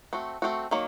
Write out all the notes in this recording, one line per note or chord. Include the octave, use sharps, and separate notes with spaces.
A3 C4 F#4
A3 C4 F#4
D#3 F#3 A#3